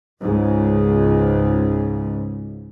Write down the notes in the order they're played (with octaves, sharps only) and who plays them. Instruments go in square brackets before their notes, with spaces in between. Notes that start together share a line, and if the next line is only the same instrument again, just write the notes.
[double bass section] C#2 G#2